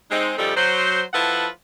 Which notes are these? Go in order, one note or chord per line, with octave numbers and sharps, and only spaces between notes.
G#3 C4 D#4
C#3 F3 G3 D#4 G4 A4
F#3 C5
F3 E4 F4 A4 B4 F#5